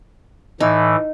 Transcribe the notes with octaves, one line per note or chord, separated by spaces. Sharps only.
A2 E3 D#4